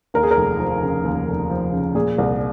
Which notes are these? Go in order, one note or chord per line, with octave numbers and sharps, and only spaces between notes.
D#2 A#4
G#4
A#4
F1
F3
C#3
D#2
F1
F3
C#3
A#2 G#4
C2